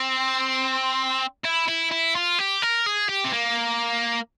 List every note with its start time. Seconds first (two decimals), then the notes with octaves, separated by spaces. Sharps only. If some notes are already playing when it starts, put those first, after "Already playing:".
Already playing: C4
1.44 E4
1.68 E4
1.91 E4
2.15 F4
2.39 G4
2.62 A#4
2.86 G#4
3.09 G4
3.25 C4
3.33 A#3